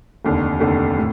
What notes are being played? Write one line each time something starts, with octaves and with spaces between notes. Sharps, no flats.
F1 D#2 D3
F1 D#2 D3
A2